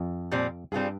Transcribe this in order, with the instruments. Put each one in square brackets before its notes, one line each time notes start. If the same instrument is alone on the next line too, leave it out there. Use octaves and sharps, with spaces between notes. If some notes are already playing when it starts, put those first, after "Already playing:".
Already playing: [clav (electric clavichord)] F2
[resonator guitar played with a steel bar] A#2 G3 C4
[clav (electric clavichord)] G2 [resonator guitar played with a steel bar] G3 C4 F4 G#4